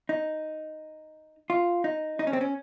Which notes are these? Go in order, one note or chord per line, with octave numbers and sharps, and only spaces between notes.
D#4
F4
D#4
D#4
C#4
C4
C#4